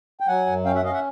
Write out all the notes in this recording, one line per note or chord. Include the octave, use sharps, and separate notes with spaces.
G5
F#3 F#5 G#5
F#2
C#4 F5 G5
E5 F#5
C#4 D#5 F5
E5 F#5